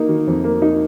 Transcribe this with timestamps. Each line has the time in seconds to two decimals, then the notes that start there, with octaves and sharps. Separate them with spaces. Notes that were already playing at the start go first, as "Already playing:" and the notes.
Already playing: A#3 D#4
0.09 D#3
0.27 F2
0.44 A#3
0.62 D#4